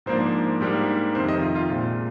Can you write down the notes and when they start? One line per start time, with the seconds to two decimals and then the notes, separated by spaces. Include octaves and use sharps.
0.06 G#2 F3 A#3 D4 C5
0.61 G#2 G3 A#3 D4
1.15 F2 C3 D#3 C5
1.29 D#5
1.42 F4
1.55 F4
1.70 A#2 G#3 C4 F4